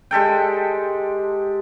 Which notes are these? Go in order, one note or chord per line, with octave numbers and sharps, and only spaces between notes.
G#3 G4 A4 G5